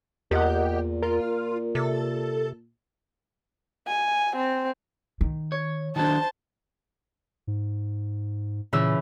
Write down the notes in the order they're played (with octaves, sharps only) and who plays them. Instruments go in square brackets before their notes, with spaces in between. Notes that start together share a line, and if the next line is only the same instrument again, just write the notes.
[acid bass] E2 [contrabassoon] A#2 [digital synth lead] G4 [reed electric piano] A#4 D#5 F#5
[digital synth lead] F4 [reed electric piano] A#4
[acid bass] C3 [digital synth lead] A4
[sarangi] G#5
C4
[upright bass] D#3
[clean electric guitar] C#5
[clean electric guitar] D#3 F#3 D4 [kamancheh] C5 A5
[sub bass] G#2
[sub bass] A#2 [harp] C#3 E3 E6